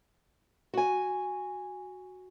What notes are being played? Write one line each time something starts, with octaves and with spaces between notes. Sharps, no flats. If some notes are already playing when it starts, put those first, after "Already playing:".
F#4 G#5